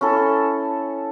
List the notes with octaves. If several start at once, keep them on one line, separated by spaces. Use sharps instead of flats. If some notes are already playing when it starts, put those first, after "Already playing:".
C#4 E4 A4